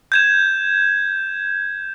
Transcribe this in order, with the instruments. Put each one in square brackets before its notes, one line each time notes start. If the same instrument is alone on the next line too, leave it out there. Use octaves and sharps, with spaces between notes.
[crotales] G6 G#6 E7